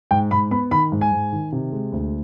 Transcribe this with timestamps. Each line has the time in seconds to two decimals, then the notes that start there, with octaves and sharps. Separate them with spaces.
0.11 G#2 G5
0.31 G#2 B5
0.51 B3 B5
0.71 D#3 B5
0.92 G#2
1.01 G#5
1.12 G#2
1.33 D#3
1.52 C3
1.72 G#3
1.92 D2